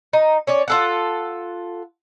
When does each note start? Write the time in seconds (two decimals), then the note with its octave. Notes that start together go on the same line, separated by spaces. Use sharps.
0.13 D#4
0.47 C#4 C#5 D5
0.68 F4 A4 F#5